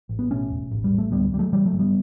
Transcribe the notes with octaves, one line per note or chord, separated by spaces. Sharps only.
A1
B3
B2 A3 C#4
E1
A1
G3
A1
A3
D2 G3 B3
D2 G3
F#3 A3
C#3 E3 G3
F#3 A3
G1
G3 B3